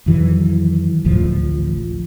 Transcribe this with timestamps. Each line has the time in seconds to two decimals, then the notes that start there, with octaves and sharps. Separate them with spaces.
0.06 F2 D#3 E3 F#3
1.04 A1 D2 A2 F3